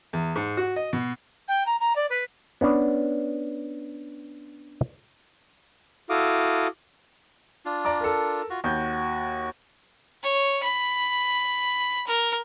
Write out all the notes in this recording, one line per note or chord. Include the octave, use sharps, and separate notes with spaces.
E2
G#2
F#4
D#5
B2
G5
A#5
A#5
D5
B4
B3 C#4 D4
E4 F#4 A4 F5 D6 D#6
D4 F4
D5 A#5 D6
A4 A#4
F4 F#4
D#2 F#4 G6
C#5
B5
A#4